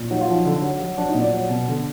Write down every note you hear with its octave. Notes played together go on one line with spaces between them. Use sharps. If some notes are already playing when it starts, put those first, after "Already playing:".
Already playing: A#2
F#3 D#4
F4
F3 D#4
D3
F#3
F#3
F#3 D4
D#4
A#2
D5
F#3
B2
D3